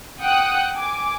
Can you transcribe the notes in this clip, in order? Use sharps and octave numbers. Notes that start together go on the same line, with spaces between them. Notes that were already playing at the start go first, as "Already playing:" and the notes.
F#5 G5 D#6 F#6
G#5 D6